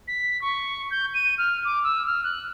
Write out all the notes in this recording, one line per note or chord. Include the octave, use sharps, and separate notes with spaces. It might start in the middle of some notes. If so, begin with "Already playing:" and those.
B6
C#6
G6
D#7
F6
D6
E6
F6
F#6